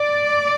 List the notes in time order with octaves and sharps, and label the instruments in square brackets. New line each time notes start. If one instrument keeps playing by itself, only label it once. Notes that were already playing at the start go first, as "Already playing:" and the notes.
Already playing: [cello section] D5